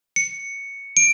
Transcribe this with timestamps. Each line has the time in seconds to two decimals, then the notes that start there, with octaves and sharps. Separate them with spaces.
0.16 C#7
0.97 D7